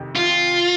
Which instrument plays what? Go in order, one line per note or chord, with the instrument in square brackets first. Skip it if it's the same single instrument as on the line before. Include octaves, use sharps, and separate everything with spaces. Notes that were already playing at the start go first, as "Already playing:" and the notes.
Already playing: [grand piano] F2 C3 D#3
[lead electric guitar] F4